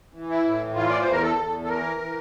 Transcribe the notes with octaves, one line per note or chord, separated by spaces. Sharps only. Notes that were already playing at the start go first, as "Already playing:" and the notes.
E3
E4
A2
E3 F4
D5
C5
E2 A#4
A4
E2
A4
E3 A#4
E3